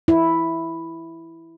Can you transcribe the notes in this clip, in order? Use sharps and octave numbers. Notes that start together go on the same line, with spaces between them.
E4